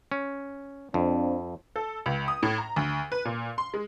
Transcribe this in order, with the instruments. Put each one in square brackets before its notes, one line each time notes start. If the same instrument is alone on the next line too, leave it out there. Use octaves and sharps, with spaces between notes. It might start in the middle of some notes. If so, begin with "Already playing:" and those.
[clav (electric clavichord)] C#4
[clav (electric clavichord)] F2 [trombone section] C4 D4
[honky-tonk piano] A4
C#2
D#6
A2
A#5
D2
B4
A#2
C6
G#3